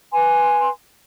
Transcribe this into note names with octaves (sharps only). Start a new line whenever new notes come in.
B4 G#5 C6